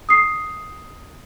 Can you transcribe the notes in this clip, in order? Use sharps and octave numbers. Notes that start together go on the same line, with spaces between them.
D#6 C7